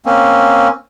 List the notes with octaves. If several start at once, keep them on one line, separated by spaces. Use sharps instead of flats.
A#3 C4 C#4